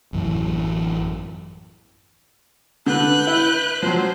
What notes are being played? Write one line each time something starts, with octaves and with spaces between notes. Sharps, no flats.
A1 F#2 E3
D3 B4 F#6 G6
E4
F3 F#3 C5